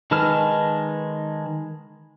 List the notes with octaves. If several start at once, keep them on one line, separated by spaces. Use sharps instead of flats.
D#3 G#3 B4 A5 F6